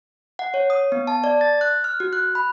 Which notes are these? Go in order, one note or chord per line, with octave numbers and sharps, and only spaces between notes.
F#5
C#5
D#6
B3
A5
D5
A6
F#6
F6
F#4
F#6
B5